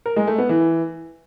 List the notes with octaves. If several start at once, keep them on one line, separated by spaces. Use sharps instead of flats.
A#4
G#3
A3
B3
E3